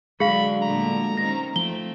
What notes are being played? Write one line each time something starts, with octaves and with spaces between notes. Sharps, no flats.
D3 F#3 G#3 D4 F#4 G#4 F5 B5
A#2 D3 A3 A#5
D#3 C4 C#4 A#6
F3 A3 C4 G7